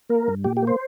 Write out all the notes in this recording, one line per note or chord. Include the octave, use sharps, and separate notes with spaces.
A#3 A#4
G2
A#2 G4
G4
A#3
C5